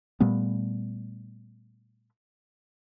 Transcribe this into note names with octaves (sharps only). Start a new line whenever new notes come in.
A#2 G3 A3 B3